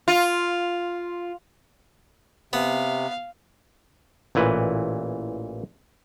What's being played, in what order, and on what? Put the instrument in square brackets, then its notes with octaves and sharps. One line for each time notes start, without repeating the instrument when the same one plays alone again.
[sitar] F4
[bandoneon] C3 [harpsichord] B3 [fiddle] F5
[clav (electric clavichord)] A1 A#2 E3 B4